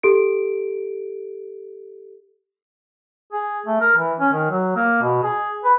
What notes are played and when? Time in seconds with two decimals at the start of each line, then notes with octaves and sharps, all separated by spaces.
0.03 G4 A4 D7
3.33 G#4
3.66 A3
3.80 A#4
3.97 E3
4.19 C#4
4.33 D#3
4.50 F#3
4.76 A#3
5.02 B2
5.23 G#4
5.64 B4